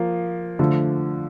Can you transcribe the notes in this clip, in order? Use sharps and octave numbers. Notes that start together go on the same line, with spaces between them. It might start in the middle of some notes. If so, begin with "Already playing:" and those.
Already playing: F3 A#3
D3 F3 A3